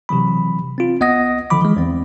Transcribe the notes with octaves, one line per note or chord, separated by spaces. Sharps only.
C3 E3 F#3 B5
C4 F4
C2 B3 D#5 F#5 D#6 A#6
B1 D3 D#3 F3 B5 D6
E3 G#3
E2 C4